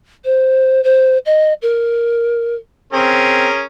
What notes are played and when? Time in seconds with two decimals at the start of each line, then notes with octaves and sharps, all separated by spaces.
0.25 C5
0.84 C5
1.26 D#5
1.62 A#4
2.93 C4 C#4 G#4 A#4